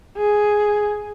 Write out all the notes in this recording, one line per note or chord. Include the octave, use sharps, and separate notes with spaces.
G#4